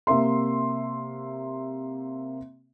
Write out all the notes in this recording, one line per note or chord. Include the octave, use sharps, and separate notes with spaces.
C3 A#3 E5 C6